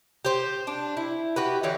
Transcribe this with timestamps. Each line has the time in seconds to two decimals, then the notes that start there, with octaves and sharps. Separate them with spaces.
0.25 G4 C5
0.67 D4
0.97 E4
1.36 F#4 G4 B4
1.63 D3 E3 G4 C#5